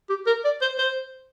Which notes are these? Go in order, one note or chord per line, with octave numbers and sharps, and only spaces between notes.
G4
A#4
D5
C5
C5